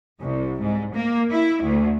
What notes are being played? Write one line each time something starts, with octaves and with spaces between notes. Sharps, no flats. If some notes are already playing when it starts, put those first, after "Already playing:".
C2
G#2
A#3
E4
D2